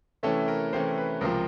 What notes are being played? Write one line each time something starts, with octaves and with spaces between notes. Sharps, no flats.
C3 E3 A3 C#4 A4
A#4
C3 E3 A3 C#4 C5
B4
C#2 C3 F3 A#4